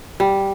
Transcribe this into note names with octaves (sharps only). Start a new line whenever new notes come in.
G3